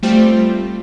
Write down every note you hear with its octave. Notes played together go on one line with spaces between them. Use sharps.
G3 A3 C4 F4 G4 C5